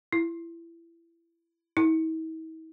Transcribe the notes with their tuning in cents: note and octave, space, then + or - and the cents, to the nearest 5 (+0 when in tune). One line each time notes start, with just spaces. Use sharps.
E4 +25
E4 -45